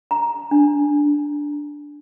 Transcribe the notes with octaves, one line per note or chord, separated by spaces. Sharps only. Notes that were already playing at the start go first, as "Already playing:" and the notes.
A#5
D4